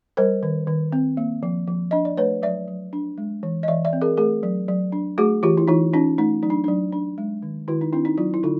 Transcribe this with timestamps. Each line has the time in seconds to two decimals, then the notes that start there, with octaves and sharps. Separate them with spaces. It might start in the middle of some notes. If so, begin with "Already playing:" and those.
0.17 G3 A#4 C5
0.43 D#3
0.67 D#3
0.92 C4
1.17 A#3
1.43 F3
1.68 F3
1.91 D4 D#5
2.05 D5
2.18 A3 B4 C#5
2.42 F#3 D5 E5
2.68 F#3
2.93 D4
3.18 G#3
3.43 E3
3.63 D#5
3.68 E3 D5 E5
3.85 D5 E5
3.93 C4
4.02 G#4 A#4
4.17 A3 G#4 A#4
4.43 F#3
4.68 F#3
4.92 D4
5.18 A3 F#4 G#4
5.43 E3 F4 G4
5.57 E4
5.68 E3 D#4 F4
5.93 C#4 D#4 F4
6.18 A3 D#4
6.43 F#3 D#4
6.50 D4
6.64 F#3 D4
6.93 D4
7.18 G#3
7.43 D#3
7.68 D#3 E4 F#4
7.81 D#4
7.93 C4 D4 E4
8.05 D#4
8.18 F#3 D#4 F4
8.34 E4
8.43 D3 D#4 F4